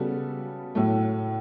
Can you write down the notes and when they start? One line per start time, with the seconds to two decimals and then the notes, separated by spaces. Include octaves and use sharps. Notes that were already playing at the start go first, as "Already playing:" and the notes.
Already playing: C#3 G3 B3 F#4 A4
0.75 A2 F#3 A3